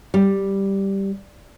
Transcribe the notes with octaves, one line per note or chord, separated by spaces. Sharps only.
G3